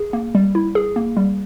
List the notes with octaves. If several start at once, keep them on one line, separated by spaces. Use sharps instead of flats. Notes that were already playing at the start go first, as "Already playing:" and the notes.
Already playing: G#4
A#3
G3
E4
G#4
A#3
G3